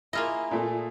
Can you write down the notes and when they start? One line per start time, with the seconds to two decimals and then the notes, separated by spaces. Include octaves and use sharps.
0.13 A#3 E4 F4 G#4 D#5 A#5
0.51 A#2 A3 G#4